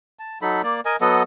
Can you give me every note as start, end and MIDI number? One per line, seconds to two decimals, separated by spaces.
0.19 0.39 81
0.42 0.62 54
0.42 0.62 63
0.42 0.62 69
0.42 0.62 83
0.63 0.81 58
0.63 0.81 74
0.85 0.96 70
0.85 0.96 75
0.85 0.96 80
1.01 1.23 54
1.01 1.23 59
1.01 1.23 69
1.01 1.23 75